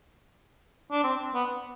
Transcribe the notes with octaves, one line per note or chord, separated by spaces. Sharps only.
D4
C4
B3